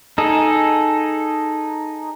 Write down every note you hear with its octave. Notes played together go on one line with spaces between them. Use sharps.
D#4 G#4 A4